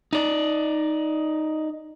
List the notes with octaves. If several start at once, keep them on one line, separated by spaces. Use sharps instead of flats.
D#4 D5